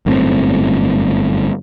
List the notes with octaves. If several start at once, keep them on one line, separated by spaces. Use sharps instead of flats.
G1 F#2 A2 C4